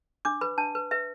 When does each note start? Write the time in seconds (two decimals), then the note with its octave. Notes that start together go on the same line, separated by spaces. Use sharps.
0.25 D4 D6
0.41 B4 B5
0.58 D4 A5
0.75 B4
0.91 B4 E5